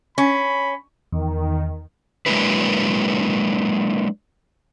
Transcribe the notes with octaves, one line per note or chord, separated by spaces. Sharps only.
C#4 B5
E2 D#3
F#3 G#3 A#3 D4 E4 B4